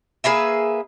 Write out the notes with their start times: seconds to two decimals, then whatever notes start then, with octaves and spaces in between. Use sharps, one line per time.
0.24 A#3 G#4 B4 E5